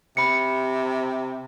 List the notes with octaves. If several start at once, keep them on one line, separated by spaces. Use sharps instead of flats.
C3 B5 C#7